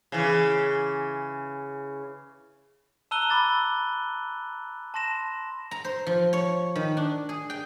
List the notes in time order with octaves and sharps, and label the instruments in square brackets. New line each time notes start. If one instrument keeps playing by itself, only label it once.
[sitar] C#3 E3
[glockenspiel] A5 A#5 E6 F#6 D#7 G7
B5 D6 A6
A5 C6 A#6 E7
[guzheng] A#5
C5
F3
C#5
D#3
D4
G#4
G5